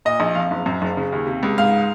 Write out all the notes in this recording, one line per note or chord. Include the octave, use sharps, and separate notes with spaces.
A#2 D#5
A#1
F2 F5
F#1
F#2
F#1
C#3
D#2
C3
C#2
G#2 F5